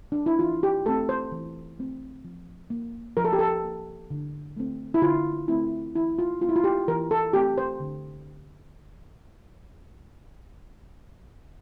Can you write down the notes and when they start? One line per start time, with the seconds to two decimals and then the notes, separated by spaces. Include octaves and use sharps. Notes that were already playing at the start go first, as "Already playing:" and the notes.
0.12 D4
0.26 E4
0.39 E3 F4
0.63 G4
0.86 A3 C4 A4
1.09 C5
1.32 E3
1.79 A3 C4
2.25 F3
2.70 A#3
3.17 F3 A#4
3.24 A4
3.33 G4
3.39 A4
3.63 A#3
4.10 D3
4.57 A3 C4
4.94 E4
5.02 D3 F4
5.48 A3 C4 E4
5.95 E3 E4
6.19 F4
6.41 A3 C4 F4
6.49 E4
6.56 F4
6.64 G4
6.88 E3 A#4
7.11 A4
7.33 A3 C4 G4
7.58 C5
7.80 D3